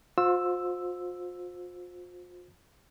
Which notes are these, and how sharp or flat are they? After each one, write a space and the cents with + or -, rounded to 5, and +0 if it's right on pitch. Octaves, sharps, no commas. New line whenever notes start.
F4 +40 C5 +0 E6 +0